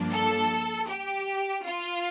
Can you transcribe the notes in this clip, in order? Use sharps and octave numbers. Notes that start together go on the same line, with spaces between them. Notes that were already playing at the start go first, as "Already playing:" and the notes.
Already playing: G2 F3 A#3 D4
A4
G4
F4